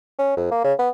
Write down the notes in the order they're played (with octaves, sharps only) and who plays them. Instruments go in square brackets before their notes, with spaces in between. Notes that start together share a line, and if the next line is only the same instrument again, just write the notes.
[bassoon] C#4
F2
A#3
C#3
B3